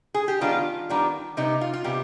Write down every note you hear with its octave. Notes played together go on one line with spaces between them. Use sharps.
G#4
G4
D#3 G3 B3 D4 F4
D#3 G3 B3 D4
C3 G3 B3 D#4
F4
F4
C3 G3 B3 G4